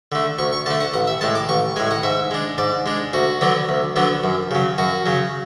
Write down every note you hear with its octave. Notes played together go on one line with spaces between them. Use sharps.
D3 A3
D2 C#6
C#6
D3 A3 A5
F#5
A1 F#5
E5
A2 G#3 A5
D6
A1 C#6
A2 G#3 G#5
F#5
G#2 E5
G#3 D4
G#2 D5
G#3 D4
D2 F#4
D3 F#3 B3 D4
D2
D3 F#3 B3 D4
F#2
C#3 F#3
F#2 F#4
C#3 F#3